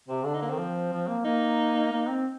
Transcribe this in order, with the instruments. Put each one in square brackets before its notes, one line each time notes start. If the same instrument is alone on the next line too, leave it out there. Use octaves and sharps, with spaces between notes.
[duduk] C3 [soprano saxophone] C4
[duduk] D3 [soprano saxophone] D4
[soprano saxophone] D#4
A#3
[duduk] D#3 [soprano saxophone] C4
[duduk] F3
F3
A#3
[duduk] A#3 [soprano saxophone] D#4
[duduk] A#3
C4